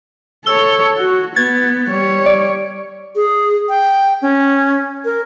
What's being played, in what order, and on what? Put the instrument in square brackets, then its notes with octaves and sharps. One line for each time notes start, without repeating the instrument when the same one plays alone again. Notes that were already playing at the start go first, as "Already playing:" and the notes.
[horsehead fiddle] A4 C#5 [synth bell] E6 G7
[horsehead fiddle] F#4
[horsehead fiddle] B3 [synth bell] G#6 A6
[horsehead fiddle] G3 C#5
[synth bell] D5
[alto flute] G#4
G5
C#4
A#4